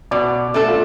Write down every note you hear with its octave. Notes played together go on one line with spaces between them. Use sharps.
B2 D5 D6
A3 D4 A4
F4 F5